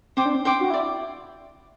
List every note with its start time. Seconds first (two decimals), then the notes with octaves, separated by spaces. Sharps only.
0.17 C4 C5 G5 D6
0.26 D4
0.35 C4
0.45 D4 C5 G5 D6
0.60 F#4
0.70 E4 D5